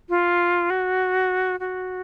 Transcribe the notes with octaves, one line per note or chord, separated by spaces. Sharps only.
F4
F#4
F#4